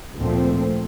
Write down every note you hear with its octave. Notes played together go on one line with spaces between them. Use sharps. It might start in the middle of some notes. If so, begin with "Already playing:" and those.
D2 A#2 F3 A3 C4